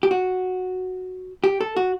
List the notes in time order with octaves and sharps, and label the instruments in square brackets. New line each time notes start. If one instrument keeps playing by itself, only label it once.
[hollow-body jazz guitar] G4
F#4
G4
A4
F#4